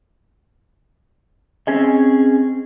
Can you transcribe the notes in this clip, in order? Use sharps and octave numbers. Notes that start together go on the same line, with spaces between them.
C4 C#4 G#4 D#5